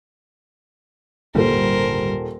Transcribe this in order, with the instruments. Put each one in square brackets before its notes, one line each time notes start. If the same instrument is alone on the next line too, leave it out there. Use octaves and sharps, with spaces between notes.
[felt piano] D#1 A4 [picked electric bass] G#1 D3 G3 [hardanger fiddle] A#4 C5